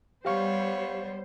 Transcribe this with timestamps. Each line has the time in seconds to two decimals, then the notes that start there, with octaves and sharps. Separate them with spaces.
0.25 G3 B3 G4 C5 C#5 F5 C#6